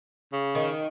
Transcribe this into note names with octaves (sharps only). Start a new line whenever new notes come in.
C#3
D#3